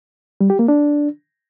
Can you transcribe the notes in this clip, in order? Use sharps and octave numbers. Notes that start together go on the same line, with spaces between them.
G3
G4
A#3
D4